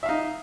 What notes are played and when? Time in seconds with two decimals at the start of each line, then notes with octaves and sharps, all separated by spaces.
0.03 E5
0.06 F5
0.09 D#4